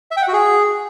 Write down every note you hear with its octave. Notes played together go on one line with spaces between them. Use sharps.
E5
G5
F#5
F#4
G#4